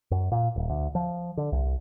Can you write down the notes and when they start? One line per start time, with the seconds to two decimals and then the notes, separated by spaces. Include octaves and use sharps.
0.11 F#2
0.32 A#2
0.56 D#1
0.70 D2
0.95 F3
1.37 D3
1.52 C2